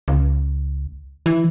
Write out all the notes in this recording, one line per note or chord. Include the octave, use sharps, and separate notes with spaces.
C#2
E3